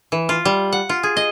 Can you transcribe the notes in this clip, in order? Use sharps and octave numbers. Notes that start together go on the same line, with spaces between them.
E3
F4
G3
F#5
F4
G#4
D#5